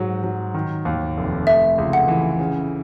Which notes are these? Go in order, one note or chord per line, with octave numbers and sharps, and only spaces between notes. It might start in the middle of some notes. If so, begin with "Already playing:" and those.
Already playing: G#2 F#3
F#3
D#3
D#2
F1
A3 E5
C#2
F#5
E3
C#3